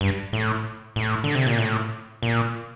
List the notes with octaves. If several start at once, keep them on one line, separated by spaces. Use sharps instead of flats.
G2
A2
A2
D3
C3
A#2
A2
A#2